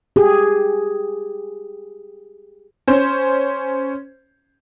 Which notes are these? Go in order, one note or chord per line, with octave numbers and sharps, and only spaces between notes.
G4 G#4
C#4 C5